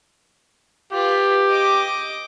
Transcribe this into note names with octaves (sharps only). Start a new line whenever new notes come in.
F4 G4 B4
D#5 D6